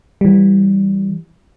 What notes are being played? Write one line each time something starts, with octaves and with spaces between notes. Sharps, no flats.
E3 G3